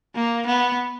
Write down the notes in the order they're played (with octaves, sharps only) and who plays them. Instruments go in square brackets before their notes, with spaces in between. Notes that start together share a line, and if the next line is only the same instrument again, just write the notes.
[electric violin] A#3
B3